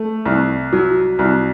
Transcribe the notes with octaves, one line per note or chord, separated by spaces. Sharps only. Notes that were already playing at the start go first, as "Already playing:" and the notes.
Already playing: A3
C2
F#3
C2